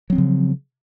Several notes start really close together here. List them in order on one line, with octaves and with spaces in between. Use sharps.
F#3 C4 F3 C#3